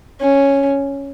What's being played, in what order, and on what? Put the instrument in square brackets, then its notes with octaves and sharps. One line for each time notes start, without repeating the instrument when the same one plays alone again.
[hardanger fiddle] C#4